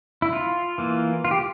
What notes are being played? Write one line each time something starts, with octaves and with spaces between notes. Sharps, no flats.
E4
F4
E3 A#3
F4
G4